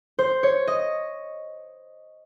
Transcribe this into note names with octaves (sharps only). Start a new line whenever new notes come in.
C5
C#5
D#5